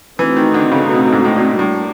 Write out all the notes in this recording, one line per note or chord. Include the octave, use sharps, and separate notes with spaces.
E3 A3 C4 D#4 F#4
D#3
D3
C#3
B2
G#2
A2
A#2
A2 G3 A#3 D4